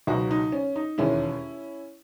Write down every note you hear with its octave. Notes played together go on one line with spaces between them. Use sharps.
C#2 B2 F#3 D#4 F#4
D#4
C#4
D#4
E1 D#2 D#3 G#3 C#4 E4